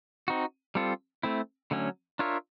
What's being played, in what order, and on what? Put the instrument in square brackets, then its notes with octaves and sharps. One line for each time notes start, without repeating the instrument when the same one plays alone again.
[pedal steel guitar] C4 D#4 F#4
G3 C4 F4 A4
A3 C4 E4
D3 F#3 A3 C#4
D4 F4 A#4 C#5 E5